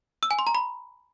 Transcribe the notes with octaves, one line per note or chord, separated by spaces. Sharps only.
E6
G#5
C6
A#5
B5